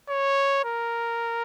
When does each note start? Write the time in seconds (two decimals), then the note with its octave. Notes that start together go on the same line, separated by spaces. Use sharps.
0.09 C#5
0.65 A#4